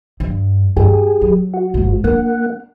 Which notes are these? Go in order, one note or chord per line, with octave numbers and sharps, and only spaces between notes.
G2
G2 G4 G#4
F#3
F#4
G1 G#2
A#3 D4 F#5